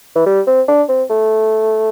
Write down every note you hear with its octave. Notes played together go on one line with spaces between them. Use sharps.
E3
G3
C4
D4
C4
A3